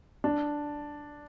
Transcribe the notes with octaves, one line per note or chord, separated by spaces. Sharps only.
D4